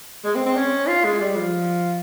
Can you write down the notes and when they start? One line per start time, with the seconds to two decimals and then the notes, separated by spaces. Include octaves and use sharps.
0.25 G#3
0.35 C4
0.46 C4
0.56 C#4
0.88 F4
1.04 G#3
1.20 G3
1.36 F3